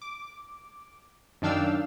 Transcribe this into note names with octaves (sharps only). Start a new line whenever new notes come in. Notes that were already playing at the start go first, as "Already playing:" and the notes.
D6
F#2 D#3 D4 F5 G5 E6